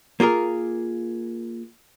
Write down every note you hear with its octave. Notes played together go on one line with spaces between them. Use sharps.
A#3 F4 G#4 A#4